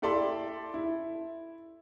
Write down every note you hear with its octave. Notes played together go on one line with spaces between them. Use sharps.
E4 G4 A4 D5 E5 C6
E4